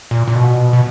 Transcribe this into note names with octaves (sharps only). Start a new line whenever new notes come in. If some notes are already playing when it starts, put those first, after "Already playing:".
A#2
A#2
B2
B2